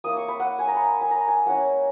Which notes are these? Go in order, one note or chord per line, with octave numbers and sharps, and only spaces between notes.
A#3 E4 D#6
C#6
B5
F#5
G#5
A#5
B5
G#5
A#5
G#5
G#3 C#4 E4 F#5